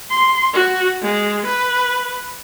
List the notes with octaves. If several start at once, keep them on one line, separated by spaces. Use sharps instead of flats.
C6
F#4
G#3
B4